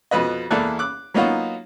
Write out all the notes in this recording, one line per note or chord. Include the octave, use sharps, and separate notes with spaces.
F2 B2 B4 D#5
E2 E3 A#3 A4 D5 F#6
D6 F#6
F#3 A#3 B3 D#4 F4 F#4